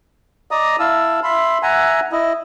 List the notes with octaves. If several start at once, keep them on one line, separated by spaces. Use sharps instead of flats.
D5 D#5 A#5 D#6
E4 F5 A5 E6
E5 B5 C6
E5 F#5 G#5 A#5
E4 D#5